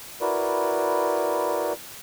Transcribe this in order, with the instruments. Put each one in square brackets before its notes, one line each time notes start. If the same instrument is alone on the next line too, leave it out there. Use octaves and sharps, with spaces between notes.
[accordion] E4 F#4 A#4 B4 D5